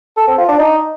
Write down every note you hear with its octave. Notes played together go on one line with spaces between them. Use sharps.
A4
C4
F4
D4
D#4